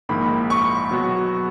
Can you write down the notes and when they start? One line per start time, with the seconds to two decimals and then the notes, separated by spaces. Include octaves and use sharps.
0.09 A#1 G#2 D#3 A#3 E4 B5
0.50 C#6
0.91 B2 F#3 B3 F#4